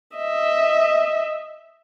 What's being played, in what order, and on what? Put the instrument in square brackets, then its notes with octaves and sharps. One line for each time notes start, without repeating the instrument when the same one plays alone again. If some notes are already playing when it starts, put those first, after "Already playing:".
[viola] D#5 E5